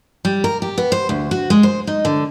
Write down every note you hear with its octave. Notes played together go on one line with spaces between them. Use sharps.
G3
A#4
G4
B3
C5
D2
F#4
G#3
C5
D#4
D3